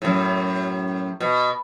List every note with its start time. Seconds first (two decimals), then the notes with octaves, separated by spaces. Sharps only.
0.02 F#2 A2
1.20 B2